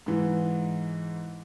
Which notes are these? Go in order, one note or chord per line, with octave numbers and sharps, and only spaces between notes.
G#2 E3